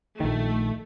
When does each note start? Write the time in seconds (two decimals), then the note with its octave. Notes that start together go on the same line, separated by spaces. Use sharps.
0.20 A#1 D#3 A3